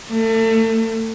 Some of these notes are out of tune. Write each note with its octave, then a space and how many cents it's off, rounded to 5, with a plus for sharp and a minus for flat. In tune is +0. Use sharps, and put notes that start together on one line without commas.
A3 +35